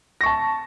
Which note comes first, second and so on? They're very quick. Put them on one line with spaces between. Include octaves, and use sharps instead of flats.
A#6 C#6 A5